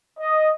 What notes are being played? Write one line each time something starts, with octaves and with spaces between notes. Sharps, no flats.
D#5